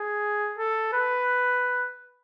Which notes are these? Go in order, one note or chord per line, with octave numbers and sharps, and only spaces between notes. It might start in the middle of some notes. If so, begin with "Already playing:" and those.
Already playing: G#4
A4
B4